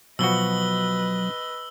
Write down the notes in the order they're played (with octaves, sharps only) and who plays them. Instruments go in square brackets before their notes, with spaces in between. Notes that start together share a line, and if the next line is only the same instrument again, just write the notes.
[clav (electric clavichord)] B2 F3 F#4 [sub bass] F#3 [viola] B4 D#5 [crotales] E6 G7